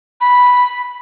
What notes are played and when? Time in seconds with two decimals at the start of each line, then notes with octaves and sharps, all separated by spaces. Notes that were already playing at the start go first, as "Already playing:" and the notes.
0.21 B5